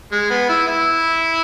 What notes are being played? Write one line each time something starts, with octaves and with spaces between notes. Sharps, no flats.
G#3
B3
E4
E4